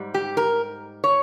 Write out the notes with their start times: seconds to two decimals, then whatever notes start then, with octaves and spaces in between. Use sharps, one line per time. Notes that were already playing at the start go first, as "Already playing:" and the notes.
Already playing: G#2 G3
0.14 G4
0.37 A#4
1.04 C#5